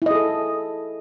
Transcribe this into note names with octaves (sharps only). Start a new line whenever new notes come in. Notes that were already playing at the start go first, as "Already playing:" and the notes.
E4 G#4 A4 D#5